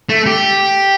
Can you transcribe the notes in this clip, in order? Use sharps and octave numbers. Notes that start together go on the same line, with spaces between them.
A3
G4